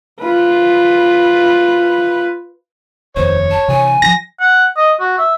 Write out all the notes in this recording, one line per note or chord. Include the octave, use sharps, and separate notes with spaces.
F4 B4
F1 D#2 C5 C#5
A5
C3 E3 G#5
C#3 F3 A#6
F#5
D#5
F#4
E5